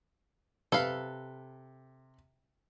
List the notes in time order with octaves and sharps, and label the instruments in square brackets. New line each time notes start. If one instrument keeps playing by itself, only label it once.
[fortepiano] C3 [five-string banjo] A4 B4 F5